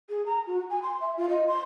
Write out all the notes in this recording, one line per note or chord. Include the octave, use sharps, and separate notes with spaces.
G#4
A#5
F#4
G#5
C6
E5
F4
D#5
C6